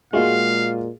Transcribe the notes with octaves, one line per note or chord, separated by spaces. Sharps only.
A#2 G#3 A#3 F4 F#4 F5